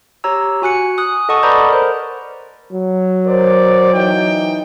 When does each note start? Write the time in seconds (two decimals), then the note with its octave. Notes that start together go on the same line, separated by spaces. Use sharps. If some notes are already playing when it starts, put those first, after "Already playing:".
0.24 G4 C#5 A#5 E6
0.62 F#4 G#5 F#6 C#7
0.98 D#6 F#6
1.29 A4 D#5 F#5 A5 C#6 D#6
1.43 B4 D5 A#5 B5 D6 G6
1.69 A#4 C5
2.72 F#3
3.26 A#4 C5 D5
3.93 E3 D#4 G5